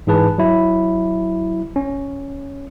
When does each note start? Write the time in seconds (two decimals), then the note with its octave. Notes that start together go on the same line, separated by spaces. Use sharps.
0.07 G#2 E3 G#4 B4 A5
0.38 F#3 E4
1.76 C#4